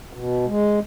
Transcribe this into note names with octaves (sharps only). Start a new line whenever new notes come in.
B2
G#3